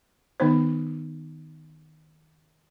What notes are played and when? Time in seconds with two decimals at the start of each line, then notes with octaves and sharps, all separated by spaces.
0.40 D#3 B3 D#4 C5